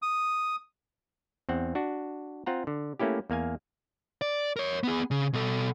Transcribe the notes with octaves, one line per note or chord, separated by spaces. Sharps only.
D#6
E2 C4 F#5
D4 F#4
C4 F4 F#5 A#5
D3
A3 A#3 C#4 E4 G4
E2 A#3 F5 G#5
D5
A#4 C#5
B3 G#4
C#3
B2 A4